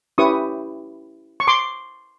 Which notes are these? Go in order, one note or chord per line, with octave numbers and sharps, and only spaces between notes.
C#4 E4 G4 B4 C#6 D#6
C#6
C6 D6